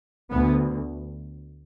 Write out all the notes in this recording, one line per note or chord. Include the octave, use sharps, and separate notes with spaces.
D2 B3